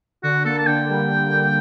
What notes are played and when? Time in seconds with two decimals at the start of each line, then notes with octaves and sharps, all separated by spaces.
0.23 D3 F#4
0.45 A#3 A4
0.58 A5
0.67 D3 G5
0.89 G3